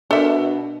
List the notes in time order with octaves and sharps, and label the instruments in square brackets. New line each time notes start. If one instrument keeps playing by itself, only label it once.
[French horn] B2 [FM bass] D4 [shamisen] A4 A#4 E5